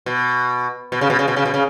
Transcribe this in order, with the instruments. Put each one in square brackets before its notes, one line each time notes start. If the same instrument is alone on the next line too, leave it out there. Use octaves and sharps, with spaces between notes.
[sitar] B2
B2
C#3
B2
C#3
B2
C#3
B2
C#3